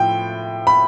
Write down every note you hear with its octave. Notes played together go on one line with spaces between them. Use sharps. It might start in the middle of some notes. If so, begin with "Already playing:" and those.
Already playing: A2 F3 E4 G5
B5